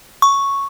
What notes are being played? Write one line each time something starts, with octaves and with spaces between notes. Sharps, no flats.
C#6